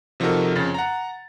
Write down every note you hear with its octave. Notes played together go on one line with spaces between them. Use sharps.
C3 F3 D#4 F#4 A4 A#4
F2 C#3 A6
F#5 A#5